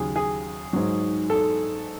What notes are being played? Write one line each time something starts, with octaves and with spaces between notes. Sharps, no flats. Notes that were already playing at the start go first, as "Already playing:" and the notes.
Already playing: D#2 C#3 F#3 G#4
G#4
G#2 F#3
A4